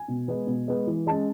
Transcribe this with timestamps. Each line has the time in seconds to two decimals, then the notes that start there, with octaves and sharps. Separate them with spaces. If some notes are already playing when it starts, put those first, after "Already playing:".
Already playing: G#5
0.08 B2
0.28 G#3 B3
0.47 B2
0.68 G#3 B3
0.87 E3
1.07 G#3 C#4 A5